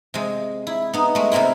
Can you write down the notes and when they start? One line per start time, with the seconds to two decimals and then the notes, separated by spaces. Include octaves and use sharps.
0.14 C3 G#3
0.67 E4
0.93 B3 D#4
1.15 G#3 A3
1.32 C3 G#3 A#3 C4 E4